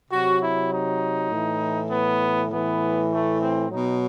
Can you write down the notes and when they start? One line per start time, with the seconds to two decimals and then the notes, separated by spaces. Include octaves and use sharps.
0.11 C3 F#3 F#4
0.41 E4
0.71 D#4
1.31 A2 E3
1.90 B3
2.51 A2 E3 B3
3.11 A3
3.41 C4
3.70 F#3 D#4
3.76 B2